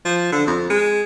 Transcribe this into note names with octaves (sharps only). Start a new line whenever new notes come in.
F3
D3
F2
G#3